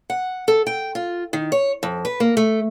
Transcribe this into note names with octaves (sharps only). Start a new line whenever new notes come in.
F#5
A4
G5
F4
D#3
C#5
F2
B4
A#3
A3